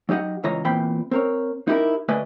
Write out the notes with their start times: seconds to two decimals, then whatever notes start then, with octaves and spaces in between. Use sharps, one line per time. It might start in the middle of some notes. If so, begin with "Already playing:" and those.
0.09 F#3 D#4 G4 D#5 F#5
0.44 C#2 E3 C#5 D#5 A#5
0.65 E2 A#2 E3 C4 G5 B5
1.11 C4 A#4 C#5
1.68 D#4 E4 G4 A#4
2.08 D2 A3 B4 D5 D#5 G#5